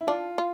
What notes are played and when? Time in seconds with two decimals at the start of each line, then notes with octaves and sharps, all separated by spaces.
0.01 E4
0.07 D4 F4
0.38 F4